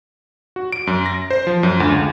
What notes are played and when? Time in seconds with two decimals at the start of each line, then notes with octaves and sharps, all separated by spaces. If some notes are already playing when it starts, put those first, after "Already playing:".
0.56 F#4
0.72 D7
0.87 F#2
1.06 A#6
1.30 C5
1.47 F3
1.63 F#2
1.80 D2
1.92 C#2